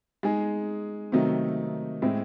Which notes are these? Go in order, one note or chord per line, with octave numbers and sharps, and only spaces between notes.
G#3 D#4 G#4
C3 D#3 F#3 A3 D#4
A2 G#3 C4 E4